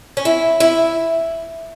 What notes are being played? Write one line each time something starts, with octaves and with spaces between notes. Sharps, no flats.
C#4
E4
E4